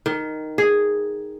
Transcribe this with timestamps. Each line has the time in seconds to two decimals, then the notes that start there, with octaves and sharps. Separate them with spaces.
0.06 D#3
0.58 G#4